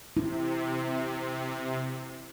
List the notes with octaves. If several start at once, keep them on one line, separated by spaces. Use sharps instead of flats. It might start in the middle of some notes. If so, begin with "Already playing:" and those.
C3 E4